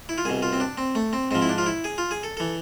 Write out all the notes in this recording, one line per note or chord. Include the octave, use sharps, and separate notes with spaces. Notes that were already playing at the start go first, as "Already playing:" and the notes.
E4
F4
C2 B2 G#4
F4
C4
D4
C4
A3
C4
G#2 F3 C4
E4
D4
F4
E4
G#4
F4
G#4
A4
E3 A4